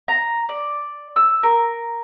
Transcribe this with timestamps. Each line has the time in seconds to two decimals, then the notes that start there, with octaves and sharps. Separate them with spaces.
0.08 A#5
0.49 D5
1.16 E6
1.43 A#4